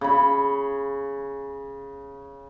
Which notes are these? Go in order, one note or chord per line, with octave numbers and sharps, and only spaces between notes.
C#3 B5